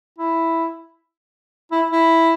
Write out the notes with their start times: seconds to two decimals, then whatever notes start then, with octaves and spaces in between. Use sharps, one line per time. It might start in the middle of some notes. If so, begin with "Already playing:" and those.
0.18 E4
1.72 E4
1.91 E4